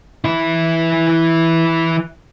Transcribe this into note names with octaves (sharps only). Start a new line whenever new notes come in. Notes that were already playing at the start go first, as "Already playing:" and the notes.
E3 E4